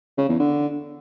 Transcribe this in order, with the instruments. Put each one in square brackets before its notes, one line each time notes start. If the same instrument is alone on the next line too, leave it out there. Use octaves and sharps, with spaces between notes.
[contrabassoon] C#3
E2
D3